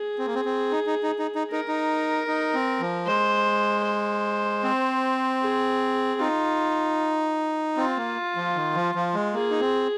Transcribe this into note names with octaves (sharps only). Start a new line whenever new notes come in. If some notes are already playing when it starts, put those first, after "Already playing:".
Already playing: G#4
C4
A#3
C4
C4
D#4
D#4
D#4
D#4
D#4
D#4 A#4
D#4
D#4
C4
F3
G#3 C5
C5
C4
G#4
D#4 F4
C4 F4
A#3
F3
D#3
F3
F3
G#3
A#3 G#4
D#4
C4